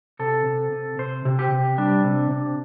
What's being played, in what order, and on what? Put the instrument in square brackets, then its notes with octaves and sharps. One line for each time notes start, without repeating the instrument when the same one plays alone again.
[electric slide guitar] C3 A4
C3
C3
C3 C5
C3
G4
C3
G3 D4
C3
C3